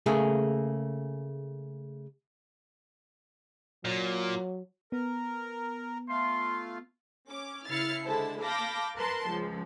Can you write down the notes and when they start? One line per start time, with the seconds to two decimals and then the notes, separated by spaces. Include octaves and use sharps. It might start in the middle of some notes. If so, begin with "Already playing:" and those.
0.06 C#3 A3 A#3 G#4
3.85 A#2 F#3
4.92 B3 A#4
6.09 A3 F4 C6
7.29 C#4 D6
7.68 C#3 E4 F6 A6 C7 C#7
8.05 D3 G#3 E4 C5 A5
8.42 F5 A5 B5 D6 G6 A#6
8.96 A#4 B4 A5 C6
9.29 C#2 F3